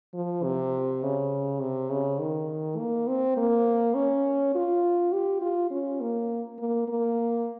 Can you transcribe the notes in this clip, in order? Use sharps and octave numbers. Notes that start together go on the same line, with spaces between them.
F3
C3
C#3
C3
C#3
D#3
A#3
C4
A#3
C#4
F4
G4
F4
C#4
A#3
A#3
A#3